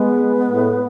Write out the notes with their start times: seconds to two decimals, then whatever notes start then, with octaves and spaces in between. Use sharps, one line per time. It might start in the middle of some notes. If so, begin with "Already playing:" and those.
Already playing: G#3 B3
0.51 A2